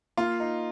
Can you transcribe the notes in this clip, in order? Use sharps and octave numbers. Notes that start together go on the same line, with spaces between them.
A#3 F4
D#4